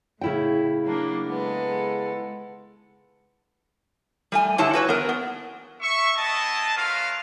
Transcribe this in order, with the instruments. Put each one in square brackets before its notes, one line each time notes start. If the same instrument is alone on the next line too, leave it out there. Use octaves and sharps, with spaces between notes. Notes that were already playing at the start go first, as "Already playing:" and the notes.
[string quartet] A2 [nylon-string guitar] C#3 E4 G5
[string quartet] F#3 A#3 D4
G#3 B3 A4
[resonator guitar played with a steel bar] G3 A3 G#5
G2 D3 E4 G4 C#5 A5
F#4 B4 C#5
B3 A#4
B3
[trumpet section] E5 C#6
B3 E4 G#4 D#5 A5
A3 C#4 F4 A#4 B4 F5